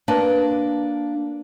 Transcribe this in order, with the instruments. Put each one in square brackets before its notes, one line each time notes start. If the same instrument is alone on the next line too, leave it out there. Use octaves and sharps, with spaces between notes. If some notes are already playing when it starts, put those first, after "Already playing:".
[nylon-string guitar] A#3 D4 B4 A5